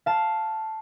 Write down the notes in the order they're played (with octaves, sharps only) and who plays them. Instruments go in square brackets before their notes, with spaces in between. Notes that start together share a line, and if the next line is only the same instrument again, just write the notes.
[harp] F5 A5